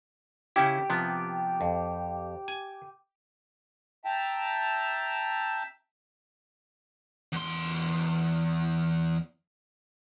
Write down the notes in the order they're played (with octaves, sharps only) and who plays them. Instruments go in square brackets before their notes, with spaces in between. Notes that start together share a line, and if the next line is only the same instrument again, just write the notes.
[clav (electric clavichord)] C#3 C#4 E4 [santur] G4
[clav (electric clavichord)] C3 F3 B3
F2
G#5
[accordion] E5 G5 A5 A#5
[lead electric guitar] E2 C6